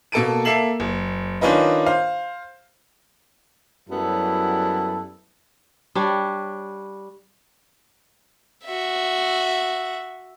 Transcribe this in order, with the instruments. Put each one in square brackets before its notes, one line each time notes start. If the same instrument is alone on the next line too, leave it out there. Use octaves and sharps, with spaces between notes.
[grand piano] B2 A#3 A4 A5 D7 D#7
A#3 A4 E5 C7 E7 F#7
F#1
D#3 C#4 D4 F4 B4 D#5
C5 F5
[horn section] F#2 F#3 G3 B3 E4 A4
[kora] G3 D4 C#5
[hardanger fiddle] F#4 E5